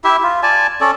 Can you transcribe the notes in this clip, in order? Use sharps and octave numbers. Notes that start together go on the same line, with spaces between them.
E4 G4 E5
F4
D5 G#5 A5
C#4 A4 D5